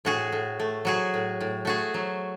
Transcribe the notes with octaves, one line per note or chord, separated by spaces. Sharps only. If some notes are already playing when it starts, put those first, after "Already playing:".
A2 F#4 G#4
A2
A3
F#3 F#4 G#4
A2
A2
A3 F#4 G#4
F#3